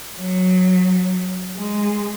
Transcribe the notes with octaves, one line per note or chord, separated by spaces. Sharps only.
F#3
G#3